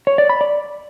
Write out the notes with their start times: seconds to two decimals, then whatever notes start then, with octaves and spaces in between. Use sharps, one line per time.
0.07 C#5
0.18 D5
0.29 B5
0.41 D5